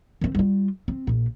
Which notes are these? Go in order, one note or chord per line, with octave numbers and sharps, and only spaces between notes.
D#3 C4
G3 F4
C4
A#1 A#2